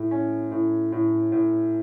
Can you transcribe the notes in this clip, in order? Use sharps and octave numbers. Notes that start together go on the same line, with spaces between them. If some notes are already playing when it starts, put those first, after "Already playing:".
Already playing: A2
C#4
A2
A2
A2